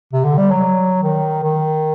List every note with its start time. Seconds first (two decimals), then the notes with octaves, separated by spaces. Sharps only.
0.13 C3
0.24 D3
0.37 G3
0.51 F#3
1.03 D#3
1.43 D#3